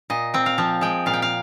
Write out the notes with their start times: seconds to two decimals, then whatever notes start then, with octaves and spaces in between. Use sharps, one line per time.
0.10 A#2 D#5
0.34 C4 G5
0.46 F5
0.58 F3
0.81 G#3 G5
1.06 A#2 F5
1.13 G5
1.22 F5